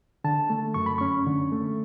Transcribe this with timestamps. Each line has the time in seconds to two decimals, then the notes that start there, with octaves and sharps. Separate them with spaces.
0.24 D3 A5
0.50 A3
0.74 F#2 C#6
0.86 B5
0.98 C#4 C#6
1.27 D3
1.52 A3